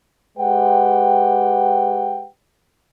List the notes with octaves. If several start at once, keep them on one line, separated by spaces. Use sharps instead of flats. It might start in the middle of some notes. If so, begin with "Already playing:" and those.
G#3 G4 B4 F#5 G5